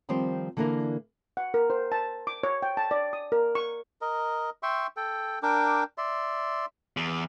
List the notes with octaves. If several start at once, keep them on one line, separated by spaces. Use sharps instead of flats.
D#3 F3 G3 C4 C5
D3 E3 A#3 D4 E4 A#4
F#5
A#4
C5
A5
D6
C#5
G5
A5
D5
D#6
A#4
C#6
A#4 D#5
E5 G5 C6 C#6
A4 G5
D4 A#4 G5 D6
D5 E5 C6
E2